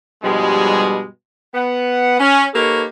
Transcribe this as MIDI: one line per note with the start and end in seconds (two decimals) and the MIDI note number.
0.23 1.06 43
0.23 1.06 47
0.23 1.06 53
0.23 1.06 55
0.23 1.06 56
1.55 2.15 59
1.55 2.15 78
2.19 2.44 61
2.54 2.84 58
2.54 2.84 63
2.54 2.84 67
2.54 2.84 69
2.54 2.84 71
2.54 2.84 73